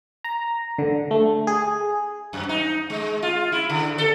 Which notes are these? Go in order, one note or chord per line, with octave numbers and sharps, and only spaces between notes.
A#5
D3
A3
G#4
F#2
D#4
G#3
F4
E4
D3
A4